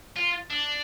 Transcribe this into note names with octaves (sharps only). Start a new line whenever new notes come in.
F4
D4